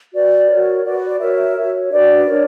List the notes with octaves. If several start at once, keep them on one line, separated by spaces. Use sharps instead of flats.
F#4 B4 D5
F#4 A#4 C#5
F#4 B4 D5
D5
F#4 A#4 C#5 E5
F#4 C#5
D4 F#4 B4 D5
D4 A#4 C#5